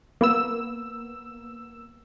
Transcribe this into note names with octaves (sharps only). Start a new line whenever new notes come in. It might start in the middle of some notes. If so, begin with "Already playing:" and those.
A#3 B3 E6